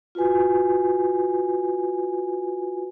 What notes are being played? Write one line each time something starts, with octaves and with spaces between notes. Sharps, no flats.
F4 F#4 B4 G#5